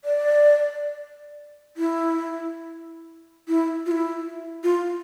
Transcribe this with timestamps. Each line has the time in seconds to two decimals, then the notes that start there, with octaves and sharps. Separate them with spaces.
0.04 D5
1.77 E4
3.48 E4
3.86 F4
3.91 E4
4.64 F4